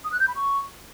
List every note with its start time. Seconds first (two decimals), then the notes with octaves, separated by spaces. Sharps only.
0.04 D#6
0.12 F#6
0.20 G6
0.28 B5
0.36 C#6